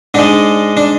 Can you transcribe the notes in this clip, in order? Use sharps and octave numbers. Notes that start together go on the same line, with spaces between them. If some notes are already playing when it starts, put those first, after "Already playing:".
G#2 G#3 D4
D4